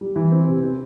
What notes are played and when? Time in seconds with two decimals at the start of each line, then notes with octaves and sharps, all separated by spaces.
0.01 G3
0.16 E3
0.32 C4
0.47 C3
0.63 C4